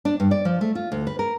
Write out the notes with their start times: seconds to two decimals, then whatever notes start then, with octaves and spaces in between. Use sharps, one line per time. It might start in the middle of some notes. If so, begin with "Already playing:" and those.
0.05 D4
0.20 G2
0.31 D5
0.45 F3
0.61 A3
0.75 F4
0.92 D2
1.07 B4
1.19 A#4